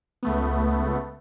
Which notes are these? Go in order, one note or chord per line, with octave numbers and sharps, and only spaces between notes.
C#2 A3 B3